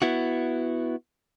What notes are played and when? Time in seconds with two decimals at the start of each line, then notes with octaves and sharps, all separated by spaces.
0.02 B3 E4 F#4